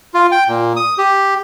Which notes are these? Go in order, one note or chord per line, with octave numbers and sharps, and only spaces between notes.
F4
G5
A#2
D#6
G4